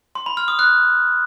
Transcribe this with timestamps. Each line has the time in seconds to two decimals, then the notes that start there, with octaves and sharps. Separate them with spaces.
0.15 C6
0.26 B5
0.37 F6
0.48 D#6
0.59 F#6